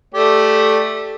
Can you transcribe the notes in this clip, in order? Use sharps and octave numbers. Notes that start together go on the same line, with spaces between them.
A3 G4 D5